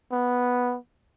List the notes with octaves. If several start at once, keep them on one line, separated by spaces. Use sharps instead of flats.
B3